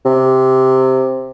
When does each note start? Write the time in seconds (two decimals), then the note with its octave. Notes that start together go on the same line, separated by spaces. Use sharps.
0.05 C3